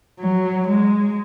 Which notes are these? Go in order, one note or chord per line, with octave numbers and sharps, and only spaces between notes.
F#3
G#3